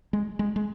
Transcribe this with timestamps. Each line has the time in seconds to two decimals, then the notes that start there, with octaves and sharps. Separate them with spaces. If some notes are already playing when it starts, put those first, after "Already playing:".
0.13 G#3
0.39 G#3
0.56 G#3